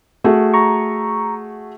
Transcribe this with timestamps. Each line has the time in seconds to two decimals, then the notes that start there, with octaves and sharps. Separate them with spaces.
0.24 A3 F#4 G#4
0.54 A#5 C#6